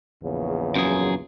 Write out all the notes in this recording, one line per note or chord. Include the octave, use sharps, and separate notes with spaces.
A#1 E2 C#3
F#2 G#4